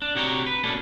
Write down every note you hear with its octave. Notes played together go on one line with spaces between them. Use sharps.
D4
C3 D4 F#4 C#5 G5 A#5
B4
B2 A#3 C#4 D4 A4